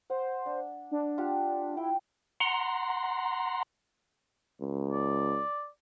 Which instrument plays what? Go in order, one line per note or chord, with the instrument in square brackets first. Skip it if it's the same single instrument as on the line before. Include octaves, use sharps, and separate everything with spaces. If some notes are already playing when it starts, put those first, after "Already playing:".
[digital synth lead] C5 [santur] F#5
[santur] D4
[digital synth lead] D4
[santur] F4 G4 F#5
[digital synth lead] E4 [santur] G5
[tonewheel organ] F#5 A#5 C6
[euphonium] C#2
[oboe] D5